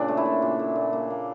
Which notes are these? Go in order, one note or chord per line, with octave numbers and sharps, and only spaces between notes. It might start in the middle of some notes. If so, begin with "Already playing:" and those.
Already playing: A#2 C#3 D4
A3
E4
A#2
A#2
A3
A#2
A#3
A#3